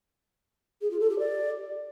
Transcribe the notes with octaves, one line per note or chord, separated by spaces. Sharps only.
G#4
F4
A4
G4
D5